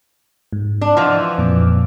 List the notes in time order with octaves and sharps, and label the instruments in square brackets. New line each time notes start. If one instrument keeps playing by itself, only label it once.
[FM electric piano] G#2
[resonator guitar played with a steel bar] D4
[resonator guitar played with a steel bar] E3 F3 [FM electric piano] D#5 F#5 C6
[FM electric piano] F2 A#2 D6